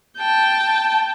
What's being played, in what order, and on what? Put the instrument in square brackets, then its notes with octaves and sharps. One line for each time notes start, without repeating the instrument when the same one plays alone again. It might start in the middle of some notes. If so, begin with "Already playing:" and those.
[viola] G5 A5